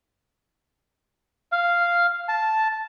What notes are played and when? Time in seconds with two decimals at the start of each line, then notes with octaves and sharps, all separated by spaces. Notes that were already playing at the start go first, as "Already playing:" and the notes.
1.52 F5
2.29 A5